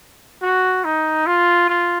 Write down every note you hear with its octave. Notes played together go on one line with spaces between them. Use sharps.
F#4
D#4
F4
F4